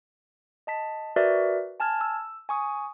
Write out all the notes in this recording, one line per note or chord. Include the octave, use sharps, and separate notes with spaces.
D#5 A5 B6
F#4 A#4 B4 D5 E5
G#5 A5 F6 G#6
E6
G#5 C#6 D#6